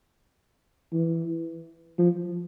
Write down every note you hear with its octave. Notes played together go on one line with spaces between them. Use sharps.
E3
F3